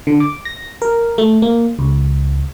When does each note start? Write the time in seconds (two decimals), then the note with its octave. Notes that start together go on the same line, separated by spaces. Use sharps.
0.07 D3
0.20 D6
0.45 A#6
0.82 A#4
1.18 A3
1.42 A#3
1.79 C#2